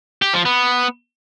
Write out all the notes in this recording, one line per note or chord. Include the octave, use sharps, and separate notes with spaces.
G4
F3
B3